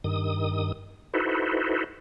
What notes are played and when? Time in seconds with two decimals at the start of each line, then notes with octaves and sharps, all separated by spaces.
0.04 G2 D#3 D#6
1.14 D#4 E4 F#4 A4 B4 C5